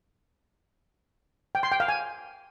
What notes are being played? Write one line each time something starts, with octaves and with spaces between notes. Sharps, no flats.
G5
C6
G5
F5
G#5